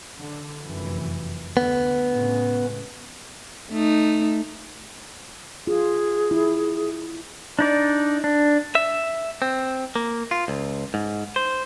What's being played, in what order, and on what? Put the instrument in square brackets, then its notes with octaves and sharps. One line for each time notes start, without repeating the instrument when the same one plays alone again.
[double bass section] D3
F1 F#2 E3
[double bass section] D2 D3 [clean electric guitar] B3
[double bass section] A2 C#3 G#3
[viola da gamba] A3 D#4
[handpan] F4 [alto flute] G#4
[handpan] E4
[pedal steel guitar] D4 D#4 D5
D4
[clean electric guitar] E5
C4
A#3
F4
C#2
G#2
C5